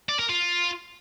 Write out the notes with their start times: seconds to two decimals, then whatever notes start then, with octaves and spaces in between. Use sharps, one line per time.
0.09 D5
0.19 A#4
0.30 F4